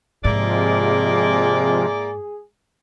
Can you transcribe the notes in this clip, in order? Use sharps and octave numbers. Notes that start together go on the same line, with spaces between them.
G#2 C3 F3 G#3 A#3 E4 G#4 D5